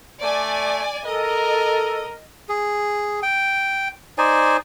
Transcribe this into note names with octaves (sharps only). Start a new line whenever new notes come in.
A3 D5 G#5
A4 A#4 D#5
G#4
G5
D#4 C5 D5 G#5